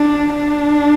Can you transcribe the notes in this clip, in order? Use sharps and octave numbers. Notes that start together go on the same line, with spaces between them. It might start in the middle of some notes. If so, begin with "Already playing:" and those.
Already playing: D4
D4